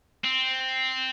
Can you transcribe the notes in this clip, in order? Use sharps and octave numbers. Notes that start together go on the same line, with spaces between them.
C4